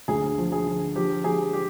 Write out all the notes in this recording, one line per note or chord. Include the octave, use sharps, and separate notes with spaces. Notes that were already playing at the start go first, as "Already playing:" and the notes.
D2 G#4
F3
G#4
D3
F3 G4
F3 G#4
G4